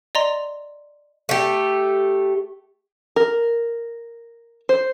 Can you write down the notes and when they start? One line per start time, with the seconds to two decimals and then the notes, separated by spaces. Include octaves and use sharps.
0.15 D5 D#5 A#5 C6
1.29 A3 G4
3.16 A#4
4.69 C5